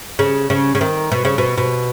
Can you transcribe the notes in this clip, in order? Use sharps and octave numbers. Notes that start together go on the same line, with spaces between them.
C#3
C#3
C#3
D#3
B2
C#3
B2
B2